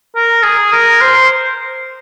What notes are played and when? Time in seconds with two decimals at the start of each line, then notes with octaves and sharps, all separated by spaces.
0.16 A#4
0.43 G#4
0.72 A#4
1.01 C5